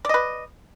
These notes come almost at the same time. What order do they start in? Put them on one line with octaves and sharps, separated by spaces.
D5 D#5 B4